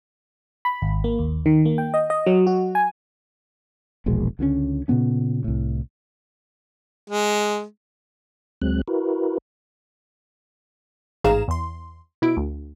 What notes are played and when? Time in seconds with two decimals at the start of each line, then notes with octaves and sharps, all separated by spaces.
0.65 B5
0.82 G#1
1.04 A#3
1.19 D#2
1.46 D#3
1.65 A#3
1.78 G5
1.94 D#5
2.10 D#5
2.26 F#3
2.47 F#4
2.75 G#5
4.06 E1 A#1 B2 G#3
4.39 C#2 D3 G#3 C#4
4.88 A#2 C#3 B3 C#4
5.44 C2 A2
7.10 G#3
8.62 D2 F#3 G#3 C4 F#6
8.88 E4 F#4 A#4 B4
11.24 A1 G#2 G#4 F5 A#5 E7
11.48 E2 C6
12.22 B2 E4 D7
12.37 D2